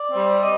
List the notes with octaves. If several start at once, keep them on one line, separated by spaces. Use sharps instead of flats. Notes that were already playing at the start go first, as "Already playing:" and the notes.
Already playing: D5
G3 C4
D#5